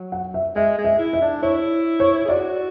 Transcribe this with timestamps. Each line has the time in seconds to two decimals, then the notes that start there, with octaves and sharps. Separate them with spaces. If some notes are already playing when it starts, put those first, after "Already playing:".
Already playing: F#3
0.12 F#5
0.34 E5
0.55 G#3 E5
0.78 G#3
0.84 E5
0.99 E4
1.13 E5
1.21 D4
1.42 E4 C#5
2.00 C#5
2.25 G#4
2.29 F#4 D5